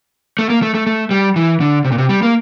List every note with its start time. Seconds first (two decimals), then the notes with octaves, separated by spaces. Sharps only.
0.39 A3
0.50 A#3
0.62 A3
0.75 A3
0.87 A3
1.11 G3
1.36 E3
1.61 D3
1.85 C3
1.92 A#2
1.98 C3
2.09 G3
2.22 A#3